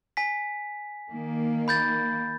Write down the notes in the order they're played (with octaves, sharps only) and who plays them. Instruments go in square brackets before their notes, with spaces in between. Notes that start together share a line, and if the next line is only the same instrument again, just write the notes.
[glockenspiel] G#5 B6
[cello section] D#3 A#3
[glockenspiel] B5 G6 A6